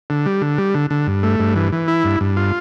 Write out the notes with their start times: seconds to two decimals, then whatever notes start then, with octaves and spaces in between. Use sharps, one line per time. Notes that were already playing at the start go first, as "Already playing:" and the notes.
0.10 D3
0.26 G3
0.42 D3
0.58 G3
0.74 D3
0.90 D3
1.07 G2
1.23 A3
1.40 G2
1.56 E3
1.72 E3
1.88 E4
2.04 G2
2.21 G2
2.37 F4